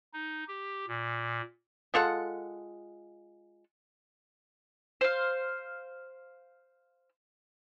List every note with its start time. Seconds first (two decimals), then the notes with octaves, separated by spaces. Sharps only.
0.13 D#4
0.48 G4
0.88 A#2
1.94 G#3 F4 A4 F#5
5.01 C5 F5